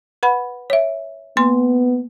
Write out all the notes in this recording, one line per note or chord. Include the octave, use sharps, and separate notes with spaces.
B4 F#5 B5
C#5 E5
A#3 B3 C6